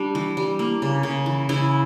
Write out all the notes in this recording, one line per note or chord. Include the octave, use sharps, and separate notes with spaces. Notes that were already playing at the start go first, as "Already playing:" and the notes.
Already playing: G3 D4
E3
G3
A#3
C#3
C#3
E3
C#3 E4